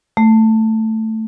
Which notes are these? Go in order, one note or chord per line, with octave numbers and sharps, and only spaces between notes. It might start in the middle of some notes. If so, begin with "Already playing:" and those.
A3